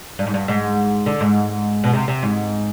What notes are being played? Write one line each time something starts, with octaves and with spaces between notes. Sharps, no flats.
G2
G#2
G2
G#2
D3
G#2
B2
C3
C3
G#2